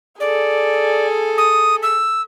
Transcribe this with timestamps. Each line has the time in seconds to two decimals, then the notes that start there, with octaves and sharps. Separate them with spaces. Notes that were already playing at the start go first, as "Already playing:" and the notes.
0.20 G#4 A4 D5
1.38 D#6
1.83 E6